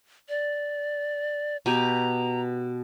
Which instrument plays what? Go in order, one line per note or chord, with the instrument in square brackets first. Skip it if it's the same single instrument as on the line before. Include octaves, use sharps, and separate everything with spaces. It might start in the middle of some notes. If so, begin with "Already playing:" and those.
[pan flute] D5
[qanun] B2 G4 G#5 [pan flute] A#5